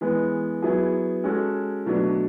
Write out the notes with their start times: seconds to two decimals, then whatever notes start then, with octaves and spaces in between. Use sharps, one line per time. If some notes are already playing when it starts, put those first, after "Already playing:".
0.01 E3 G#3 B3
0.62 F#3 B3 E4 G#4
1.24 G#3 C#4 F#4 A4
1.86 B2 F#3 A3 D4